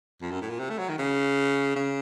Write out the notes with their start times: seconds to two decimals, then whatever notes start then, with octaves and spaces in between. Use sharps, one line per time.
0.22 F2
0.31 F#2
0.41 A2
0.50 A#2
0.60 C3
0.70 A3
0.79 F#3
0.89 D#3
0.98 C#3
1.76 C#3